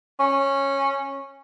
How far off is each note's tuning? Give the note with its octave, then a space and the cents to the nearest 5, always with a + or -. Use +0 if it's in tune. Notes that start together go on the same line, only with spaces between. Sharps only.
C#4 -15